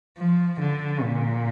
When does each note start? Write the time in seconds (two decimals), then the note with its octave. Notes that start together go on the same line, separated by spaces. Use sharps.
0.18 F3
0.61 D3
1.02 A#2